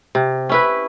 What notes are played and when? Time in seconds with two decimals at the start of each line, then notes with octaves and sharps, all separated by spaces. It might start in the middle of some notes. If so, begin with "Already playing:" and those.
0.15 C3
0.49 C#4 E4 B4